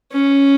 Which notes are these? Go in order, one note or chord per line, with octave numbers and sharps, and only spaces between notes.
C#4